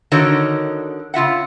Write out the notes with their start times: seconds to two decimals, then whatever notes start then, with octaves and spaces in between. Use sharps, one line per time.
0.12 D3 D#3 D#4 F#4 A#4 C#5
1.14 C#3 F4 E5 F#5